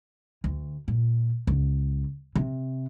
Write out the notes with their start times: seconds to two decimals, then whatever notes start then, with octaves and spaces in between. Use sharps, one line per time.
0.44 D2
0.88 A#2
1.47 C#2
2.35 C3